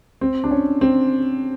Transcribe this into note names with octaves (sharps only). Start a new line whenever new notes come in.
C4
D4
C#4
C4